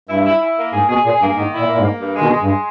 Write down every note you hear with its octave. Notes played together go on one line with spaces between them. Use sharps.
G2 E4
E4
E4
A#3
G#2 G#4
B2 G#4
A#2 G#4
G2 A#3
G#2 D#3
E4
A#2
A#2 A#3
G#2
A#3
G2
G#3
B2 D#3
G#3
G2
G#3